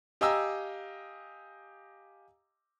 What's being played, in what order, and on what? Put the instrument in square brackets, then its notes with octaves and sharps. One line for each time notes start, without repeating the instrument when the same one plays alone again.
[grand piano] G4 D#5 F5 G#5 A#5 E6